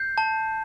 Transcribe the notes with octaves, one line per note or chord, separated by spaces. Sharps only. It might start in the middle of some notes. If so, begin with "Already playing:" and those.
Already playing: G6 C7
A5